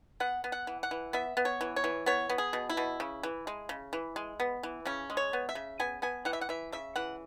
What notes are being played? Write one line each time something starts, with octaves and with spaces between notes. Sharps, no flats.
B3 F#5
B3
F#5
E3
F#5
E3
B3 E5
B3
C#5
E3
C#5
E3
B3 C#5
B3
G#4
B2
E4
B2
C#3
E3
G#3
C#3
E3
G#3
B3
E3
C#3 C#4
G#3
C#5
B3
E5
C#3
B3 G#5
B3 G#5
E3 F#5
E5
F#5
E3 E5
C#3 E5
E3 F#5